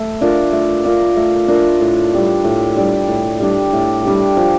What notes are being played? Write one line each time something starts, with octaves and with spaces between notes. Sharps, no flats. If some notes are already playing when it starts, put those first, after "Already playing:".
Already playing: A3
D4 F4 A#4
A3
D4 F4 A#4
A3
D4 F4 A#4
A2
G3 D4 G4
A2
G3 D4 G4
A2
G3 D4 G4
A2
G3 D4 G4
F3